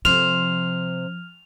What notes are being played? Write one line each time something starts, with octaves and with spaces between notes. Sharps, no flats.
C3 F3 C5 F6 F7